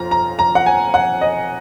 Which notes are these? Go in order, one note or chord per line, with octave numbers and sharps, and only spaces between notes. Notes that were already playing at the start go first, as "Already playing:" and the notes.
Already playing: F2 F4 A#5
A#5
A#5
F#5
G#5
F#5
D#5